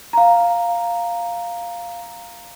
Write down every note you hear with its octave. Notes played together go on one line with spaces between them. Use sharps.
F5 A#5